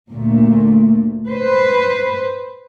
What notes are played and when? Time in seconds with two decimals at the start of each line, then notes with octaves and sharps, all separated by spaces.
0.10 D2 A#2 A3
1.28 B4 C5